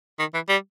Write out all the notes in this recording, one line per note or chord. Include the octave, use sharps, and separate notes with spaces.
D#3
E3
G3